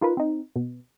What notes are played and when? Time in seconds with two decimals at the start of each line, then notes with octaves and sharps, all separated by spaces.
0.01 D#4 F4 A#4 B4
0.17 C4 D#4
0.56 B2